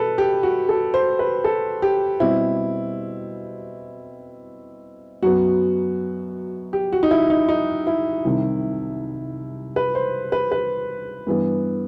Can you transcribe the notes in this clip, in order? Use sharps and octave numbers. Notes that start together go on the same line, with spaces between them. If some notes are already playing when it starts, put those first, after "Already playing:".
Already playing: B2 A4 B4
G4
F#4
A4
C5
B4
A4
G4
B2 G3 C4 E4
F#2 F#3 B3 F#4
G4
F#4
D#4
E4
D#4
D#4
E4
C2 C3 D#3
B4
C5
B4
B4
G2 E3 B3